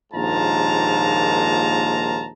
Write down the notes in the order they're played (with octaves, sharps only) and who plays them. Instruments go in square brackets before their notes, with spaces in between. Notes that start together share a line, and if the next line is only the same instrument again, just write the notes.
[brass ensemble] A#1 D#2 G#2 F4 A5 A#5